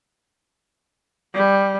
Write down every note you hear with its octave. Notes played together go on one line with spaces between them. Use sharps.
G3